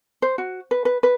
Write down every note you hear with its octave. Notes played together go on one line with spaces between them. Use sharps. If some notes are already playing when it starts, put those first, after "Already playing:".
C5
F#4
B4
B4
B4